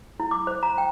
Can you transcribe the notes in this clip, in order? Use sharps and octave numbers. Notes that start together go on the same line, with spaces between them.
E4
D6
C5
A#5
G5